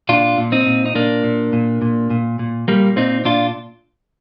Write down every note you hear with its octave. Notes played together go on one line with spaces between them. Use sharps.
A#2 D4 F4
A#2
C4 D#4
A#2
D#4
A#2 A#3 D4
A#2
A#2
A#2
A#2
A#2
A#2 G3 A#3
A#2 C4 D#4
A#2 D4 F4